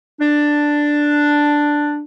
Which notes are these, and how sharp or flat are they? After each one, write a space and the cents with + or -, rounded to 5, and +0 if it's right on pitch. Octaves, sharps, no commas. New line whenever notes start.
D4 +5